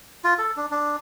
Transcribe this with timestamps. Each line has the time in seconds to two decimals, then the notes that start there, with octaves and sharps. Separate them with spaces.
0.24 F4
0.38 A4
0.57 D4
0.71 D4